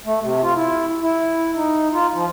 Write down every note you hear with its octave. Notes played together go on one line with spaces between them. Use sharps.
A3
C3
F4
E4
E4
D#4
F4
F3